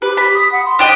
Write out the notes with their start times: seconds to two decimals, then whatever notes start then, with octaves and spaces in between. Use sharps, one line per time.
0.02 G4 B4
0.17 B5
0.34 D#6
0.52 F#5
0.65 C6
0.79 D4 G4 D#5